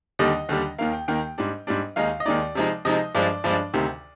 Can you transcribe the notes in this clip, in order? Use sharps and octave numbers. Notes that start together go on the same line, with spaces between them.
D#2 D3 G3 D4 D#5
D#2 D3 G3 D4
D#2 D#3 A#3 F5
G5
D#2 D#3 A#3 G5
G#2 G3 D4
G#2 G3 D4
D#2 D#3 G#3 D#4 F5
D#5
D#2 D#3 G#3 D#4 D5
C3 F3 G#3 D#4
C3 F3 G#3 D#4 D#5
G2 F3 G#3 D4 D5
G2 F3 G#3 D4
D2 C3 D#3